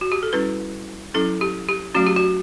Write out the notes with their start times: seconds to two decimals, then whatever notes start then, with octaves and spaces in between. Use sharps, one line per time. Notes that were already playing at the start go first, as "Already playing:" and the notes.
0.01 F#4
0.12 G4
0.23 A4
0.33 G3 C#4 E4 B4
1.14 F#3 C#4 E4 A4
1.41 G4
1.69 G4
1.95 F#3 A3 C#4 F#4
2.06 G4
2.16 F#4